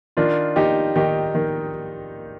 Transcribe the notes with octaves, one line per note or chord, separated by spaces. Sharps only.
D#3 D4 F4
D#3 D#4 G4
D#3 D#4 G4
D#3